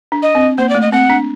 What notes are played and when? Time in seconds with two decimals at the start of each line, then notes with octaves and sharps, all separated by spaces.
0.12 D4
0.23 D#5
0.35 C4
0.58 A#3 C5
0.69 D5
0.75 A3
0.82 D#5
0.92 C4 F#5
1.10 D4